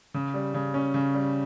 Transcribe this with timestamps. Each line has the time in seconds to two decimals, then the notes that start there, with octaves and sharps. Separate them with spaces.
0.14 C#3
0.34 G3
0.54 C#3
0.74 C#4
0.94 C#3
1.14 G3